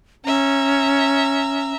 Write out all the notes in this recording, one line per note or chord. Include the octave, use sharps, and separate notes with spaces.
C#4 E5 A#5